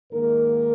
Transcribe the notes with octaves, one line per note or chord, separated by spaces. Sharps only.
G#2 D#3 A#3 D#4 A#4